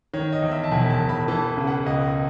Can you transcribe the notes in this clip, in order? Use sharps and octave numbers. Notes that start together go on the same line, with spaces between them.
D#3 C#5
D#5
E2
E5
A5
E1 G#5
A5
E1
B5
E3 A5
C#3
F#5
C#2 D#5